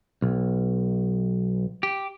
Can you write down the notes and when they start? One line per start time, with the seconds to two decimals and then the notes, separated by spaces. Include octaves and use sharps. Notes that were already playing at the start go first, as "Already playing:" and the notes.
0.22 B1
1.83 G4